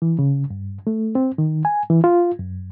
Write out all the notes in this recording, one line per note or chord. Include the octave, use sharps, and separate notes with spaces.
E3
C#3
G2
A3
C4
D#3
G#5
E3
F4
F#2